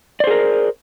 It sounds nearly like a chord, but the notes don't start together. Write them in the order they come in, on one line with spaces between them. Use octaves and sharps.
D5 C5 G#4 A#4